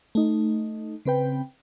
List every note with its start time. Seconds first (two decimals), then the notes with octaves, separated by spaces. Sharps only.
0.15 A3 D#4
1.05 C#3 C4 B4 G5